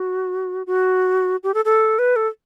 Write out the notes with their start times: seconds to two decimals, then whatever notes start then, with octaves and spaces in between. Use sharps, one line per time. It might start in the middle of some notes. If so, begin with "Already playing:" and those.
Already playing: F#4
0.67 F#4
1.43 G4
1.54 A4
1.65 A4
1.99 B4
2.16 A4